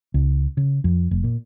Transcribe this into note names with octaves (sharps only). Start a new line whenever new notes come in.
C#2
C#3
F2
F1
A#2